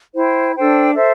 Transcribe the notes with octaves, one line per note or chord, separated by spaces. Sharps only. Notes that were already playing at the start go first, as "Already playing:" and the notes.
E4 C5 G5
D4 A4 C5 G5
A4 C5 E5